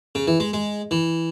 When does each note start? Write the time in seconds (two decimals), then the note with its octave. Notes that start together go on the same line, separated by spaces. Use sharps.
0.15 C#3
0.27 E3
0.40 G#3
0.53 G#3
0.91 E3